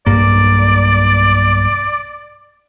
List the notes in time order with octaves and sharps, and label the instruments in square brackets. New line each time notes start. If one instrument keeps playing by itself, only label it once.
[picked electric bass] B1 G2 A#3 [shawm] D5